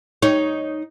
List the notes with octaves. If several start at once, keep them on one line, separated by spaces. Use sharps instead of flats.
D#4 C#5